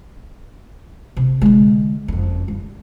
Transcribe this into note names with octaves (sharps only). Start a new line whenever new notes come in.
C3
D3 G#3
F#1 F2
G3